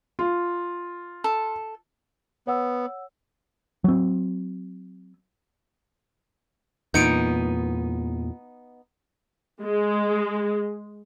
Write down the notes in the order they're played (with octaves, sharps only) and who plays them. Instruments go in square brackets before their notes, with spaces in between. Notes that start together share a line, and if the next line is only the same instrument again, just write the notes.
[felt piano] F4
[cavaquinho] A4
[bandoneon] B3 [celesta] C#5 F#5 E6
[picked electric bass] F#3 C4
[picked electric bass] E2 A#2 [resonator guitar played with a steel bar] B3 D#4 [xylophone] G6 C#7 D7
[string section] G#3